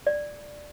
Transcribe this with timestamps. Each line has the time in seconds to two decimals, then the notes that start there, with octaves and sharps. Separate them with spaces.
0.07 D5